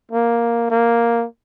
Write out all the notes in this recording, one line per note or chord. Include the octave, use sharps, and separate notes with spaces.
A#3
A#3